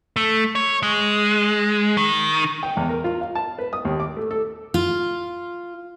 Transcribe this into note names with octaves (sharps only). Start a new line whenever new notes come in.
A3
C#5
G#3
D#3
G5
E2
A#4
F4
F5
A5
B4
D#6
D#2
D6
A3
A4
F4